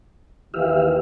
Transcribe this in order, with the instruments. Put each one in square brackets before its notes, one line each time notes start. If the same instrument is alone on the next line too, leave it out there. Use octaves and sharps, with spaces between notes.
[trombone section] D#2 D#3 E3 [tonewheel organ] G4 E5 F5